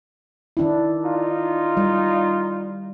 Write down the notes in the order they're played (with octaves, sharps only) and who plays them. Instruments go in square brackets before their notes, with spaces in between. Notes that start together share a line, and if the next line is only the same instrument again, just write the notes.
[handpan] D#3 D4 E4
[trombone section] D#4 F4
[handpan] G3